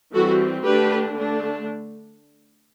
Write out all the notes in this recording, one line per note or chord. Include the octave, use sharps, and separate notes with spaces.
E3 G3 C4 F#4 A4
D3 A3 D4 G4 B4
D3 A3 D4